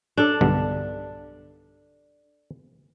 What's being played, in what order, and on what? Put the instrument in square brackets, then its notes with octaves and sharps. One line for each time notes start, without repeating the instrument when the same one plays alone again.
[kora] D4 A4
[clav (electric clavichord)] B1 G2 D3